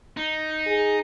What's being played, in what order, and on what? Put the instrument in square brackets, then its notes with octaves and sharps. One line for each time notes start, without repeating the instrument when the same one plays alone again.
[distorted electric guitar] D#4
[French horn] G#4